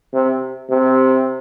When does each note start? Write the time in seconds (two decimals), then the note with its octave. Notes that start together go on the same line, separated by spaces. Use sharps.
0.13 C3
0.70 C3